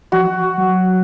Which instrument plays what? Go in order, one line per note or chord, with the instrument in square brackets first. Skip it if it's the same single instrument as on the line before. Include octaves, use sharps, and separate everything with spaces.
[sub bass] F3 [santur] F#4
[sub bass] F#3